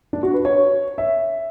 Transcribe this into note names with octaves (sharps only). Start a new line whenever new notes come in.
D4
F#4
B4
C#5
E5